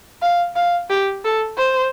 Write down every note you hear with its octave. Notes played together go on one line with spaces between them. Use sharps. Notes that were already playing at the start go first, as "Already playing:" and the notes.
F5
F5
G4
A4
C5